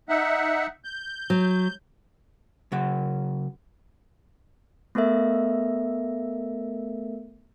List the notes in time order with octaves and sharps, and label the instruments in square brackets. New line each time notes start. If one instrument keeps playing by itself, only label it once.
[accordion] D#4 E5 F#5
G6
[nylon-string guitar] F#3
[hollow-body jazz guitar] C#3 F#3 F#5
[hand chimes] A3 B3 A4 A#4 E5